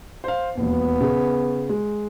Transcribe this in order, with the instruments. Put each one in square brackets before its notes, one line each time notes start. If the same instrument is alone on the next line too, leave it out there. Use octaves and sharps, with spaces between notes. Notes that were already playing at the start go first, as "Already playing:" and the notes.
[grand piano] C5 F5
[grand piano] E1 D#2 [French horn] B3
[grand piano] C#3
G#3